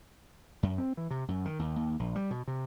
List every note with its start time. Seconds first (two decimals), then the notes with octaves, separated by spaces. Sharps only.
0.63 F#2
0.78 C4
0.97 E3
1.11 C3
1.28 F#2
1.45 D#3
1.59 D#2
1.76 D#2
1.99 A#1
2.15 G3
2.31 B2
2.48 C3